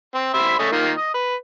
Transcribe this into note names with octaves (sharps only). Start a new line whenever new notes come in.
C4
C5 E5 B5
A3 C#4 D#5
D#3 A#3 F4
D#5
B4